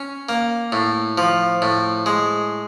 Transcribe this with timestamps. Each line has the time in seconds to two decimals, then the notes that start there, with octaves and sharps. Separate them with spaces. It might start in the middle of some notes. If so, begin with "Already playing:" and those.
Already playing: C#4
0.29 A#3
0.72 A2
1.18 F3
1.62 A2
2.06 G#3